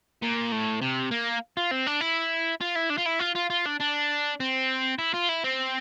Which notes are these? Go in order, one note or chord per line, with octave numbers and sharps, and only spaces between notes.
A#2
A2
C3
A#3
F4
C4
D4
E4
F4
E4
D4
F4
E4
F4
F4
F4
D4
D4
C4
E4
F4
E4
C4